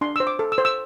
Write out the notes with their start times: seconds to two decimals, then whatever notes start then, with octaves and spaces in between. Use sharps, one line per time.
0.01 D4 C6
0.16 C5 E6
0.27 D6
0.39 A4
0.52 E6
0.58 C5
0.65 E6